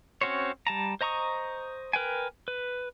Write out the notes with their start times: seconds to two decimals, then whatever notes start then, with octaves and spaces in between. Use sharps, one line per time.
0.21 C4 C#4 F#4 C5 C#5
0.67 G3 A5 A#5
1.01 C5 D#5 A#5 C#6 D#6
1.93 A#4 B4 G5 G#5
2.48 B4